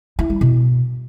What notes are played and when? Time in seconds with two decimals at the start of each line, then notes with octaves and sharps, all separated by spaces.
0.19 E4
0.30 G3
0.41 B2